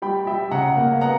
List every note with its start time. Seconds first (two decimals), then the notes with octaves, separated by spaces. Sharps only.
0.02 G3 G5 B5
0.26 G3 E5 G5
0.51 C#3 F#5 A#5
0.77 A#3
1.01 B3 F#5 A#5